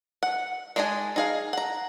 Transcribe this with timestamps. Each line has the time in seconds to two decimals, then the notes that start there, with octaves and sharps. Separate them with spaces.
0.23 F#5
0.76 G#3 D4 D#4 D#5 G#5
1.16 D#4 G#4 F5
1.53 F#5 A#5